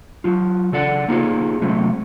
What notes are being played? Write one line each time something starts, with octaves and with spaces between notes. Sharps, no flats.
F#3 F4
C#3 A4 D5 F#5
A#3 D#4 F4 G#4 C5
C3 F#3 G#3 A3 C4 C#4